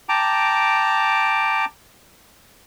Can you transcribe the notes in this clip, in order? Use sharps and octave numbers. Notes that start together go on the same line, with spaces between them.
G5 A5 A#5 D6